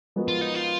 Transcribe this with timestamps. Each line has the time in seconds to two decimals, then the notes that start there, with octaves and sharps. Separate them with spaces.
0.16 F3 G#3 B3 F#4 A#4
0.28 F4
0.41 D#4
0.55 F4